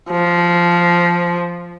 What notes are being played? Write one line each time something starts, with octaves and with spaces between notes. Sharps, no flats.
F3